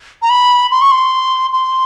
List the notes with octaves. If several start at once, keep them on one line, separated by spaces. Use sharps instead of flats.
A#5
B5
C6
C#6
C6
C6